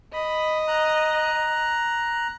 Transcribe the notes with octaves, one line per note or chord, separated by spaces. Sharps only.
D#5 B5
A#5 F#6